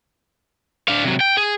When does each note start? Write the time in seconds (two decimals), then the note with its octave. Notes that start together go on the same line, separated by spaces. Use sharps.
0.88 D4 F5
1.04 C3 F#3
1.20 G5
1.37 G#4